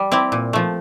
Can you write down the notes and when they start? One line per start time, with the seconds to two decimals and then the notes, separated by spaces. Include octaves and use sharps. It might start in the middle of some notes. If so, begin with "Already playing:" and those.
Already playing: G3
0.12 C4 E4 G4
0.32 A#2
0.53 F3 A3